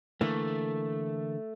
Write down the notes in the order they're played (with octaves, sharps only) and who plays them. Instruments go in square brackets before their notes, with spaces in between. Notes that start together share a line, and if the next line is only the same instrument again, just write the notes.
[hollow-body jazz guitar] D3 E3 A#3 [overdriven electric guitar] A3